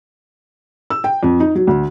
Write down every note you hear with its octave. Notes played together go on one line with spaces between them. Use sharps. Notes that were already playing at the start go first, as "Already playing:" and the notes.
E6
G5
F2
D#4
F#3
D2